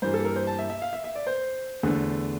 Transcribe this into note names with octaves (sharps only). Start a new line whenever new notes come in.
G2 E3 A#3 C5
A4
A#4
C5
A5
E5
E5
F5
E5
E5
D5
C5
E2 D3 A3